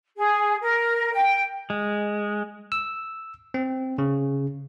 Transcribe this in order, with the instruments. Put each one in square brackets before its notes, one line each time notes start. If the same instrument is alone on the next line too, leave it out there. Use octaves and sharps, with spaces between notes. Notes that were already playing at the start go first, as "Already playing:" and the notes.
[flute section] G#4
A#4
G5
[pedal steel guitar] G#3
[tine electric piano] E6
C4
C#3